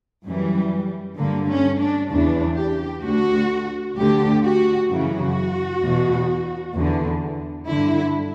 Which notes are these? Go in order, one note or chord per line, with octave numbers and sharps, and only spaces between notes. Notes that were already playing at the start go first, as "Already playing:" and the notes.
F#2 E3 G3
G2 D3 A#3
C#4
D4
E2 C#3 E3 D4
G4
D2 D3 F#4
D2 D3 G4
F#4
F#2 C#3 E3 F#4
E2 B2
E2 D3
G2 D3 E4